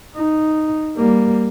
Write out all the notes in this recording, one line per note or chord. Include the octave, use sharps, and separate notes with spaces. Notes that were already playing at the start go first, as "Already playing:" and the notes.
D#4
G3 A#3